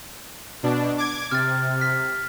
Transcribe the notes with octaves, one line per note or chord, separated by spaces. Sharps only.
B2 D4
D6 G#6
C3 F6 A6
F6 B6